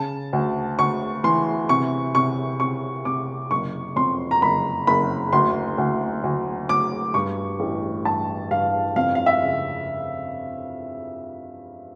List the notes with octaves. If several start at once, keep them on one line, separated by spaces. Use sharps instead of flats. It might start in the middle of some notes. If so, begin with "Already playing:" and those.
Already playing: C#3 A5
D2
D2 C#6
E3 C6
C3 C#6
C3 C#6
C3 C#6
C3 D6
F#1 C#6
F2 C6
A#5
F#1 B5
F#1 B5
D2 C6
D2
D2
D2 D6
G2 C#6
A1
G2 A5
G2 F5
F2 F5
F5
E5
C#3